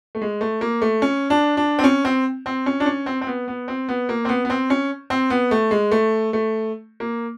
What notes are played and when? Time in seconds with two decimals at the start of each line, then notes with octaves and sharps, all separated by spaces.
0.15 A3
0.22 G#3
0.41 A3
0.61 A#3
0.82 A3
1.02 C#4
1.30 D4
1.57 D4
1.79 C4
1.84 C#4
2.05 C4
2.46 C4
2.66 C#4
2.80 D4
2.86 C#4
3.06 C4
3.21 C4
3.27 B3
3.48 B3
3.68 C4
3.89 B3
4.09 A#3
4.25 C4
4.29 B3
4.45 B3
4.50 C4
4.70 C#4
5.10 C4
5.30 B3
5.51 A3
5.71 G#3
5.91 A3
6.33 A3
7.00 A#3